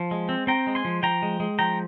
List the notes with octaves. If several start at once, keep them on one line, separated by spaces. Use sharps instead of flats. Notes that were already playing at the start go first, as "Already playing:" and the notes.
Already playing: F3
G#3
C4
C4 G5 A#5
G#3
G#5 C6
F3
F3 G5 A#5
G#3
G#3
F3 G5 A#5